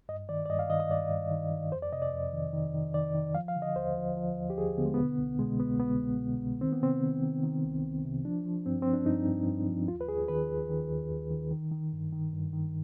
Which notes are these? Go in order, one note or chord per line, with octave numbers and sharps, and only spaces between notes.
G2 D#5
D#3 D5
D5
G2 D#5
F5
D#3 D#5
D#5
G2 D5
G2
D#3
D#3
F2 C5
D5
C3 D#5
D5
F2
D#3
D#3
D#3
D#3 D5
D#3
F3 F5
F5
D3
D#5
D#2 C5
F3
F3
D#2
G4
D#2 G#4
D3 B3
G#3
B2 B3
C2
B2 G#3
C2 B3
C2 B3
C2
B2
C2
D#3 C4
B3
C3 C4
D#3
D#3
D#3
C2
C2
C3
F3 D4
F3
G2 C4
F3 C4
D4
G2 D#4
G2
G2
F3
D#2 F4
B4
D#2 G#4
D#3 B4
D#2
D#3
D#2
D#2
D#3
D#3
D#3
G2
D#3
G2
D#3